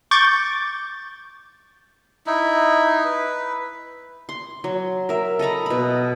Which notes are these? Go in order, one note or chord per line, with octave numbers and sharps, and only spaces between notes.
C#6 D6 G6 A6
D#4 E4
B4
C6
F#3
A#4 E5
A4 D#5 A#5 B5
B2 B5